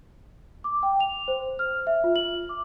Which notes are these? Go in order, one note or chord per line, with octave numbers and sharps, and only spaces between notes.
D6
G5
F7
C5
F6
E5
F4
F#7
D6